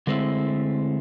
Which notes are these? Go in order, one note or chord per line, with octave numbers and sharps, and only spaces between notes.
D3 G#3 A3 C4 E4